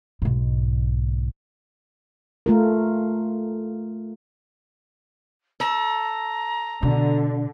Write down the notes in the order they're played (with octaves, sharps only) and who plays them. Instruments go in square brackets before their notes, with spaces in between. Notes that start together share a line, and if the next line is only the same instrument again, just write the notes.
[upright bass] B1 G#2
[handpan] A3 F4 A#4
[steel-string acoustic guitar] A4 [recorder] A#5
[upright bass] B2 [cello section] D3